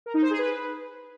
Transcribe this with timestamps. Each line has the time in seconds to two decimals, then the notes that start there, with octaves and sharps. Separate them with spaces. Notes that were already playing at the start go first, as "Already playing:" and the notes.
0.06 A#4
0.14 D#4
0.22 C5
0.30 G#4
0.39 B4